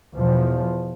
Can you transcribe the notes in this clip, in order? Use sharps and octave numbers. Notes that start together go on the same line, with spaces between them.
E2 B2 F3